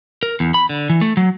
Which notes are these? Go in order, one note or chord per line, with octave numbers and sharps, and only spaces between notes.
A#4
E2
B5
D3
E3
A3
F#3